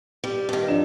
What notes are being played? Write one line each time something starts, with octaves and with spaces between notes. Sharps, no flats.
G3
G2 D#3
F3 D4 E7